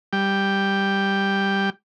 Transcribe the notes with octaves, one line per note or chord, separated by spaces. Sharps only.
G3 G5